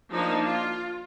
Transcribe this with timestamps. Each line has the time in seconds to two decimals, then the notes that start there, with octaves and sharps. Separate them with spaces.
0.12 F3 A#3 D4 D#4
0.45 F4